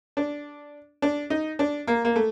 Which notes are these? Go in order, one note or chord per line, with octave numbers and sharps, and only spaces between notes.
D4
D4
D#4
D4
A#3
A#3
A3